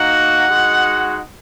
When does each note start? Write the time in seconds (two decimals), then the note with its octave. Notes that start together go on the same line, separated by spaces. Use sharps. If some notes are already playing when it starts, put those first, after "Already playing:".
Already playing: A#3 D#4 F#4 F#5
0.49 G#3 D#4 F#4